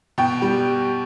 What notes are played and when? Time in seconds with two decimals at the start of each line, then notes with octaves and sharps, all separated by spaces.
0.18 B2 G5
0.42 G3